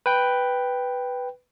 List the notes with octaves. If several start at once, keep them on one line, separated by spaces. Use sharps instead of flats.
B4 G5